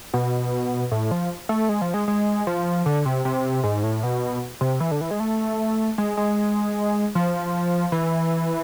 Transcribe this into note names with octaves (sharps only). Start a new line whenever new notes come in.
B2
A2
F3
A3
G#3
F3
G#3
G#3
F3
D3
C3
C3
G#2
A2
B2
C3
E3
D3
E3
G#3
A3
G#3
G#3
F3
E3